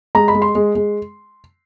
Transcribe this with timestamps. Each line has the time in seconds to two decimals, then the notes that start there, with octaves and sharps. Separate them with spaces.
0.15 G#3 A#5
0.28 B5
0.35 G#3
0.42 C6
0.55 G#3
0.75 G#3